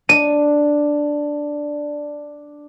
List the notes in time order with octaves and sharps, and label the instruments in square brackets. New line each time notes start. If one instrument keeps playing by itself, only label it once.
[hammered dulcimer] D4 [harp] D#7